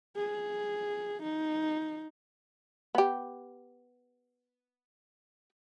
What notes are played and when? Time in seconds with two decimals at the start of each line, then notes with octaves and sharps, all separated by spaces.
0.16 G#4
1.23 D#4
2.95 B3 G4